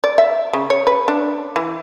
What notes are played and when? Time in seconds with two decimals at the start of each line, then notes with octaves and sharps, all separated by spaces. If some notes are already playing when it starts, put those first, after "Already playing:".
0.04 D5
0.18 E5
0.53 C#3
0.70 C#5
0.87 B4
1.08 D4
1.56 E3